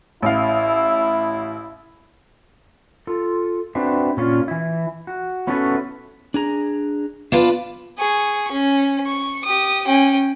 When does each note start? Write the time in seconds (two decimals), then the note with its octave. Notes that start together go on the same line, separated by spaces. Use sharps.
0.22 A1 E4 F5
3.07 F4 A4
3.75 C4 D4 F#4 B4 E5
4.17 A#2 C#4 F4
4.48 E3 E4
5.07 F#4
5.47 B3 C#4 E4 F#4 A4 B4
6.34 D4 G#4 A#5
7.32 B3 D4 F4 B4
7.98 G#4 C#6
8.51 C#4
9.06 C#6
9.45 G4 D#6
9.87 C#4 G5